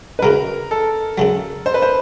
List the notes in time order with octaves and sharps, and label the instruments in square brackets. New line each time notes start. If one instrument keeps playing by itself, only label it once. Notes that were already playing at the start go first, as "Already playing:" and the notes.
[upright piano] B4
[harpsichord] F#2 C#3 F#3 [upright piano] A#4
[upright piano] A4
[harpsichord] F#2 C#3 F#3
[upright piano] C5
B4
C5